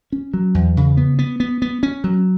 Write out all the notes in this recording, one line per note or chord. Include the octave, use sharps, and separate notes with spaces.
C#4
F#3
E2
C#3
B3
B3
B3
B3
C#4
F#3